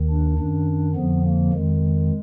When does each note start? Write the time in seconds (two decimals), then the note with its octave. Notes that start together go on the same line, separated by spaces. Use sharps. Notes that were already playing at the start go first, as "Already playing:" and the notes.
Already playing: D#2 D#3
0.10 D4
0.38 F#2 D#3 D4
0.95 F2 D3 F3 B3
1.25 A#3
1.53 F2 D#3 G#3